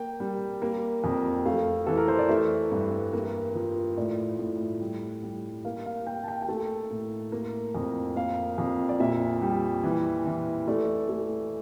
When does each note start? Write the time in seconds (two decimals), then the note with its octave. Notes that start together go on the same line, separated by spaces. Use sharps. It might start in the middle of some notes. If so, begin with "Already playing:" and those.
Already playing: A#3 G5
0.20 G3
0.62 A#3
1.04 F2
1.46 A3 F5
1.87 E3 A4
1.97 A#4
2.08 C5
2.19 D5
2.29 A3 E5
2.71 G2
3.13 A#3
3.55 F3
3.97 A2 D5
4.39 A2
4.81 G3
5.23 G3
5.64 A#3 F5
5.86 F5
6.07 A#3 G5
6.24 A5
6.28 G5
6.42 G5
6.49 A3 A5
6.90 A2
7.32 A#3
7.75 F2
8.16 A#3 F5
8.58 F2
8.89 D5
9.00 A#2 E5
9.42 G3
9.84 E3
10.26 E3
10.68 A3 D5
11.09 A3